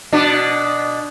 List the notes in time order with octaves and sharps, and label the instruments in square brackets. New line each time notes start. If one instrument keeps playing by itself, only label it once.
[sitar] B2 D4